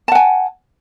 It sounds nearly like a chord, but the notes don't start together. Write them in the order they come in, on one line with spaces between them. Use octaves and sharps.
A5 F#5 G#5